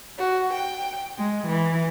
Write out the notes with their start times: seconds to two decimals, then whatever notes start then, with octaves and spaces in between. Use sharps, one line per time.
0.17 F#4
0.52 G5
1.17 G#3
1.46 E3